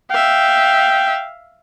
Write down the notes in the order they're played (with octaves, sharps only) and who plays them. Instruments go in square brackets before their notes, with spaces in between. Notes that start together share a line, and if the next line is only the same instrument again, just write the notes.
[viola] E5 F5 [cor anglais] G5